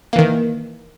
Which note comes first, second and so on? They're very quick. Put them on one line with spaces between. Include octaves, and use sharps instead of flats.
A#3 E3 D#3